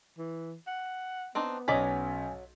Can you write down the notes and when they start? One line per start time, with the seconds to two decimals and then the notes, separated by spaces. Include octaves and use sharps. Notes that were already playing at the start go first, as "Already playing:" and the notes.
0.18 E3
0.67 F#5
1.35 B3 C4 D4 D#4
1.68 B1 F#3 C#4 D5 D#5 G#5 B6